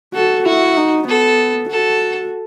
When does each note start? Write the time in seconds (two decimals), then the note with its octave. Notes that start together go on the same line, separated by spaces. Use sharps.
0.14 F#4 A4
0.45 E4 F#4
0.77 D#4
1.08 B3 A4
1.70 F#4 A4